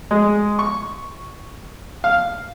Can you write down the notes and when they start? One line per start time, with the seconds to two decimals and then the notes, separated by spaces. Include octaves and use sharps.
0.11 G#3
0.59 C#6
2.04 F5